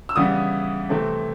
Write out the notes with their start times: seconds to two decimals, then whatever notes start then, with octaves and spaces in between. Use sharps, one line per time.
0.09 E6
0.16 C#3 E3 G3 B3 D#6
0.89 C3 E3 A3 C4